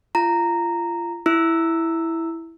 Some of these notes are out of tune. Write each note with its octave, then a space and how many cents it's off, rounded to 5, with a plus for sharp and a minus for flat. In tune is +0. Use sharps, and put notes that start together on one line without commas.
F4 -35 A#5 -10
E4 +0 E6 +0